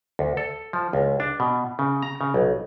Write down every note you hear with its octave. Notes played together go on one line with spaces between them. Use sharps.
D2
A4
F3
C#2
D4
B2
C#3
A#5
C#3
B1